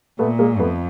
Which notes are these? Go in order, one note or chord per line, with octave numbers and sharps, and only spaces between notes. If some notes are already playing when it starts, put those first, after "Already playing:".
A#2 A3 B3
G#3 A#3
F2 A3 B3